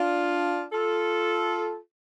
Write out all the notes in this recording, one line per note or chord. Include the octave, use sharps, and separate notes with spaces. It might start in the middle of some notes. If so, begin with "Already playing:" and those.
Already playing: D4 F4
F4 A4